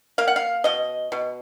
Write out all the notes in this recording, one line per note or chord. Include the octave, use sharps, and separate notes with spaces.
A#3 F5
F#5
F5
B2 D#5
B2